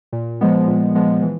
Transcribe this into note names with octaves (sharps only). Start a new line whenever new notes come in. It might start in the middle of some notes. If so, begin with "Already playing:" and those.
A#2
F3 G#3 B3
A#2
F3 G#3 B3
E3